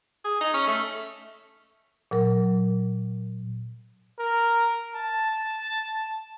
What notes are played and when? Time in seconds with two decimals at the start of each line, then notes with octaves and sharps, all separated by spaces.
0.25 G#4
0.41 D#4
0.54 C#4
0.67 A3
2.11 A#2 F#3 A#4
4.19 A#4
4.95 A5